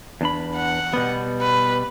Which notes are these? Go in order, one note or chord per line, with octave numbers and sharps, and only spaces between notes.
E2 D4 B5
F#5
B2 G3 B3
B4